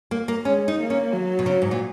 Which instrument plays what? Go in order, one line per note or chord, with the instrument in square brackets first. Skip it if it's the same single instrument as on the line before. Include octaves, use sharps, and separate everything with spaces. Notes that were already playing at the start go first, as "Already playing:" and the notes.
[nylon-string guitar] A#3
A#3
[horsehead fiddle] G#3 [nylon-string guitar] C#4
[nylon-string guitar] D#4
[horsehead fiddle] A#3
[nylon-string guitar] C#4
[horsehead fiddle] F#3
[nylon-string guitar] B2
C#3
G#2
A#2